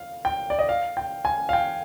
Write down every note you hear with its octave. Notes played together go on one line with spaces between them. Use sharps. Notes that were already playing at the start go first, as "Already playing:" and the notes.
Already playing: F5
G5
D5
D#5
F5
G5
G#5
F5
G5